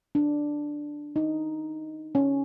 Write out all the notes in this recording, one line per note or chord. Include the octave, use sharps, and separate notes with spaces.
D4
D#4
C#4